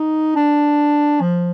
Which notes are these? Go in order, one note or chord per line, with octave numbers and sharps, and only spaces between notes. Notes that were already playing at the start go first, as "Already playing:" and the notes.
Already playing: D#4
D4
F3